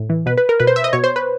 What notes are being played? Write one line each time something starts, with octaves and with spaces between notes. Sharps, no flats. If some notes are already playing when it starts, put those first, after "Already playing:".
Already playing: A2
E3
B2 B4
B4
A#4
B2 B4
C5
E5
D#5
B2 C#5
C5
B4